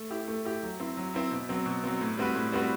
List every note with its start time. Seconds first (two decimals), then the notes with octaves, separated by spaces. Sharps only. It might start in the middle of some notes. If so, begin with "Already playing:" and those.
Already playing: A3
0.10 E4 G4
0.28 A3
0.45 E4 G4
0.63 F#3
0.80 C4 E4
0.97 F#3
1.14 C4 E4
1.31 B2
1.49 F#3 C4
1.66 B2
1.84 F#3 C4
2.01 A2
2.17 G3 C4 F#4 B4
2.35 A2
2.52 G3 C4 F#4 B4